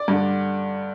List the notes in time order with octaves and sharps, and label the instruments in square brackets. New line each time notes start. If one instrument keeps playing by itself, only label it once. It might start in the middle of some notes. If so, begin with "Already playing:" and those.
Already playing: [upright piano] D5
G2 D3